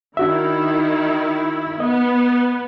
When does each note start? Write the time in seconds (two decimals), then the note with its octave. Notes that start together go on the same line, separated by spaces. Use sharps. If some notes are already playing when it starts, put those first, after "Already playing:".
0.17 D#3 D4 E4 F#4 E5
1.80 B3 D#5